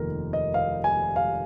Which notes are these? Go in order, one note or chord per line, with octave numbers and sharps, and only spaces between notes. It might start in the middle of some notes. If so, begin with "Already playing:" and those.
Already playing: F1 D#2 D#3 A#4
D#5
F5
G#5
F5